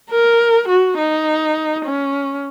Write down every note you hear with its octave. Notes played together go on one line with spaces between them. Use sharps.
A#4
F#4
D#4
C#4